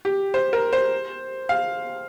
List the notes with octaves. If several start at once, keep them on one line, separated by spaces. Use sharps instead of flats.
G4
C5
A#4
C5
F5